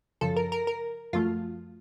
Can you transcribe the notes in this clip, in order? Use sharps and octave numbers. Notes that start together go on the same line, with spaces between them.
F#2 C#3 F3 A4
A#4
A#4
A#4
F#2 F3 A3 F4